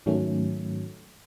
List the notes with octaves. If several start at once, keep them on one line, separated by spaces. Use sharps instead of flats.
G#2 D#3 F#3 A3 C#4